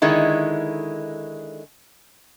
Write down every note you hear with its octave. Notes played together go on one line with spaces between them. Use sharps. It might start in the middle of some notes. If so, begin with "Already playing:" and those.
D3 D#3 G#3 E4